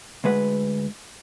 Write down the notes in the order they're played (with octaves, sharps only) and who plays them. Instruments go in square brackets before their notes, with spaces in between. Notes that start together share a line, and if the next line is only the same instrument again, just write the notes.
[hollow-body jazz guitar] D2 G#3 B4 F#5